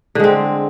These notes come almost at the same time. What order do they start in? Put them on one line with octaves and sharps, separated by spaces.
D3 G#3 C4